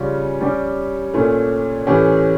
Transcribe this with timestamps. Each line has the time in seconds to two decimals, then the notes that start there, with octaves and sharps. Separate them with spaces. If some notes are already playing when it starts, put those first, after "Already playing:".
Already playing: C#3 G3 C#4 F4
0.41 G3 C#4 G4
1.13 A#2 A3 C#4
1.87 A2 E3 A3 C#4 G4